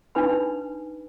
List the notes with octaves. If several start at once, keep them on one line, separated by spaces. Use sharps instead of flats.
D4 D#4 B4 G#5 B5